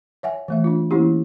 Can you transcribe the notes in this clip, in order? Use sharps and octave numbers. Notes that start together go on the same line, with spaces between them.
C#5 E5 F#5 G#5
E3 A3 E5
D4 F4
E3 A#3 C#4 E4 G4